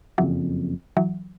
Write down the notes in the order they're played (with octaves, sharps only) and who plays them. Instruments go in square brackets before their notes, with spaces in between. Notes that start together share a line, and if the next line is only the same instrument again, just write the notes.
[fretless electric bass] F#1 F2 C#3 [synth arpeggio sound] E3 F#3
[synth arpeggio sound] E3 F#3